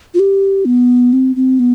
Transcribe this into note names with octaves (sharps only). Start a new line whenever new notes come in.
F4
G4
B3
C4
C4
B3